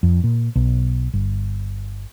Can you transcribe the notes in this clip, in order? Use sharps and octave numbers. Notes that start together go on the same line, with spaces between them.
F2
A#2
B1
G1